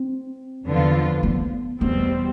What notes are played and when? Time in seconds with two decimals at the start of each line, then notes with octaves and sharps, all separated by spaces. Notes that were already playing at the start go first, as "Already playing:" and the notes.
Already playing: C4
0.64 E2 D3 F3 B3 F4
1.23 B3
1.80 E2 B2 G3 B3 C4